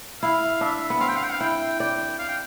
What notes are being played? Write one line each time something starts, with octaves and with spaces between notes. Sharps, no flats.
E4 F5
D4 E5
B3
C4 F5
G5
F5
G5
F5
E4 G5
D5 G5
F5
G5